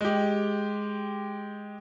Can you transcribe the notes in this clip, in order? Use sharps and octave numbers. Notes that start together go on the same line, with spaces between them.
G#3 G4